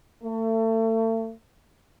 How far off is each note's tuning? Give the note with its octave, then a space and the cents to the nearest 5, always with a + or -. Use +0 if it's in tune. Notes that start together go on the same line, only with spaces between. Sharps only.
A3 +35